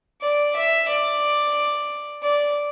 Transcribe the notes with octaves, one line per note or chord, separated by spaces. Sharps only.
D5
E5
D5
D5